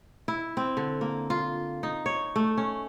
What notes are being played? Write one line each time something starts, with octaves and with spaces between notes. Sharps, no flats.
E4
C4
D3
A#3
F4
D#4
C#5
A3
C#4